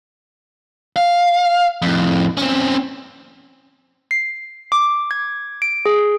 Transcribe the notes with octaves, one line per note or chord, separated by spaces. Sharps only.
F5
F2 A2
C4 C#4
C7
D6
G#6
D7
G#4